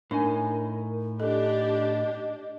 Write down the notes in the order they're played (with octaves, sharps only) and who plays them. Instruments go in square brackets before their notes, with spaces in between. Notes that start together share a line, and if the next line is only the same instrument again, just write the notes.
[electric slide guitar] A2 D#4 G#5 [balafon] D4 [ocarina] A#4
[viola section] D4 G4 [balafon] A4 [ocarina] D#5